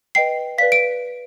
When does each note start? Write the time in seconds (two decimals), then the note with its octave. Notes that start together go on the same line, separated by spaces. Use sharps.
0.15 B4 D#5 G5 C7
0.58 B4 D5 F5 B6
0.72 D7